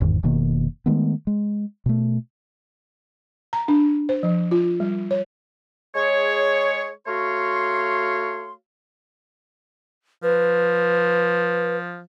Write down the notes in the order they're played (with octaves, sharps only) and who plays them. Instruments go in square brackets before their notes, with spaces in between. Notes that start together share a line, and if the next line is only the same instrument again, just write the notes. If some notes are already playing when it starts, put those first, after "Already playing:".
[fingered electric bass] G1 E2 G#2 D#3
F1 B2 D#3 A#3
D#3 G#3 A3 B3
G#3
B2 A3
[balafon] A#5
D4
C5
F3
F4
G3
C#5
[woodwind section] G#3 G#4 C#5
A3 F#4 C#5 F5 C6
[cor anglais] F3 [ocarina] B4